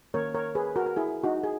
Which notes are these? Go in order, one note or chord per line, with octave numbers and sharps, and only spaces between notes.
D#3 A#3 C#4 A#4 C#5
A#4 C#5
G#4 B4
F#4 A#4
A#4
E4 G#4
D#4 F#4
G#4